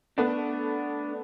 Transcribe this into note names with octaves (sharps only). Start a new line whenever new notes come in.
A3 B3 D4